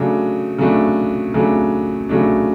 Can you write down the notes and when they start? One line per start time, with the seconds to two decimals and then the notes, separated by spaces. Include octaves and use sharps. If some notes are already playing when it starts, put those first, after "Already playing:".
Already playing: C#3 F#3 A3 D4
0.58 C#3 F#3 A3 D4
1.34 C#3 F#3 A3 D4
2.09 C#3 F#3 A3 D4